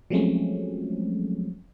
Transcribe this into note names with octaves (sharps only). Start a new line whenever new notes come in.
F3 F#3 G#3 A3 C4 C#4